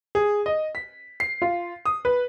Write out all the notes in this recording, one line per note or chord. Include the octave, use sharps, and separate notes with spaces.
G#4
D#5
B6
C7
F4
D#6
B4